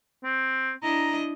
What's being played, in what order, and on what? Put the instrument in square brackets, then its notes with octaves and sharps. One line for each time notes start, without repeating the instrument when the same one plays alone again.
[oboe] C4
[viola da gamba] D4 E4 D#5 [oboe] A#5